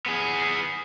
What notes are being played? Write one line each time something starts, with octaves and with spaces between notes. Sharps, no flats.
B3 G#4